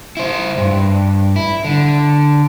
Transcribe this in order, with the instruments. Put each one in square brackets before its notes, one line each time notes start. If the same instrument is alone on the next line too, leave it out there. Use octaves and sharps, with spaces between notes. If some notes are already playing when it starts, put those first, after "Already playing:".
[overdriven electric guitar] E4 C5
G2
E4
D3